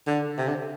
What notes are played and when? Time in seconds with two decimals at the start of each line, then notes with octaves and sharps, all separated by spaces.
0.07 D3
0.38 C3
0.48 D3